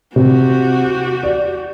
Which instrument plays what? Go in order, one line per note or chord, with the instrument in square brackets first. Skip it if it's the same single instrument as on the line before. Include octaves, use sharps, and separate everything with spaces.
[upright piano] C3 [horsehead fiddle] F#4 G4
[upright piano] D5